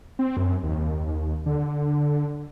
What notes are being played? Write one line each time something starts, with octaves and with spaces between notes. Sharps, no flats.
C4
F#2
D#2
D3